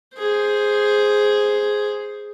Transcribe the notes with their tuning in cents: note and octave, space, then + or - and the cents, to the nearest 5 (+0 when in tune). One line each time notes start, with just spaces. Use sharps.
G#4 +0 C5 +0